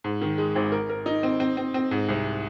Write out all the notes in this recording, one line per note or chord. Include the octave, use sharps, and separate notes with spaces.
G#2
D#3
G#3
G#1
A#4
A#4
D#4
C4
C4
C4
C4
G#2
C2